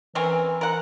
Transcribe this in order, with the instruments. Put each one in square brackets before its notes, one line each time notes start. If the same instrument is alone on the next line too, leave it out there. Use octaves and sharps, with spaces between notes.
[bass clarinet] E3 [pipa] C4 C#4 A#4
[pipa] A#4 F#5